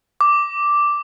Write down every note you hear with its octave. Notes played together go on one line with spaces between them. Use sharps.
D6